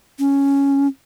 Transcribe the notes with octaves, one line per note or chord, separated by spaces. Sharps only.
C#4